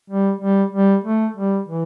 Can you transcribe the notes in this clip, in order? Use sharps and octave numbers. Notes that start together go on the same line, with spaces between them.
G3
G3
G3
A3
G3
E3